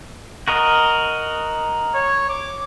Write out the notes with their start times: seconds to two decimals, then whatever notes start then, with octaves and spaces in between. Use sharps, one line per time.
0.48 F#4 A#4 D#5
1.94 C#5
2.29 D6